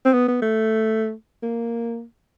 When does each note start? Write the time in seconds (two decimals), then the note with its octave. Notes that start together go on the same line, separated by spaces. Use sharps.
0.05 C4
0.13 B3
0.28 B3
0.42 A3
1.43 A#3